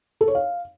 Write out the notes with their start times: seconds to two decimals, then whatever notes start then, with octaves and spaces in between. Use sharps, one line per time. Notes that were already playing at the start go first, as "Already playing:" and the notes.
0.21 A4
0.28 C#5
0.35 F5